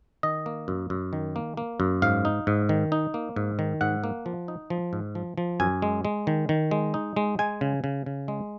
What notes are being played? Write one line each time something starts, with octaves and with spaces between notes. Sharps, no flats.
D#3 D#5
A#3
F#2
F#2
D#3
A#3
A#3
F#2
G#2 F5
D#4
G#2
D#3
D#4
A#3
G#2
D#3
G#2 F#5
A#3
F3
D#4
F3
G#2
F3
F3
F#2 G#5
G#3
G#3
D#3
D#3
G#3
D#4
G#3
G#3 G#5
C#3
C#3
C#3
G#3